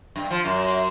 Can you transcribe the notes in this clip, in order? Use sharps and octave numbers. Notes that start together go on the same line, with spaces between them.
G2
F3
F#2